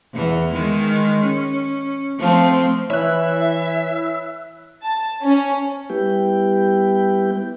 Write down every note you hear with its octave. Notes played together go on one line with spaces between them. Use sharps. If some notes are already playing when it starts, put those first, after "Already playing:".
E2 E3
D#3 G#3
C#4
F3 A3 C4
E3 E4 C#5 E5 F#6
A5
C#4
G3 B3 E4 G4 B4 G5